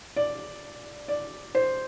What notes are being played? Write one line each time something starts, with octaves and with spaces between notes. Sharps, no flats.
D5
D5
C5